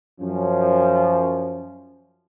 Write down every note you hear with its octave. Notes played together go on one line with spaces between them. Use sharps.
F#2 F3 C#4